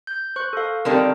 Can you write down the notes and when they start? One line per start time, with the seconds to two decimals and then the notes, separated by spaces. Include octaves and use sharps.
0.07 G6
0.36 C5 C#6 F#6
0.53 A4 F5
0.85 D3 D#3 G3 C4 D4 A#4